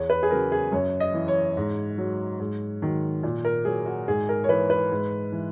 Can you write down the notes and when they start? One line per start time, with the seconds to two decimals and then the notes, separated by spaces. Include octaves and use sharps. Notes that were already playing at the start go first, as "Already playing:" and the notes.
Already playing: E2 C#5
0.10 B4
0.23 G#4
0.30 C#3 F#3 A#4
0.52 G#4
0.72 F#2 C#5
1.00 D#5
1.14 E3
1.28 C#5
1.57 G#2
1.98 F#3
2.40 G#2
2.82 D#3 F#3
3.23 A#2
3.45 A#4
3.65 F#3 G#4
3.86 F#4
4.08 G#2 G#4
4.29 A#4
4.44 C#5
4.49 E3 B4
4.70 B4
4.91 G#2
5.32 E3